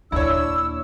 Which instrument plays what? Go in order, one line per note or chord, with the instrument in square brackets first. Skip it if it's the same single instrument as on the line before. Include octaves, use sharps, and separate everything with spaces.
[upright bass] D#2 A#2 [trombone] D4 [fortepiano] E4 C#5 [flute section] E6